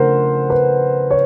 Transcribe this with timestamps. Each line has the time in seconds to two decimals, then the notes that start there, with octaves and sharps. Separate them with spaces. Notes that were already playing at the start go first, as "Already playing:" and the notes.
Already playing: C#3 F3 A3 D4 A#4 C5 F#5
0.50 B4
1.11 C#5